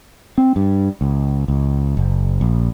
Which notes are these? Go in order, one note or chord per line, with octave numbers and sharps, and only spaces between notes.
C4
G2
C#2
C#2
F#1
A#1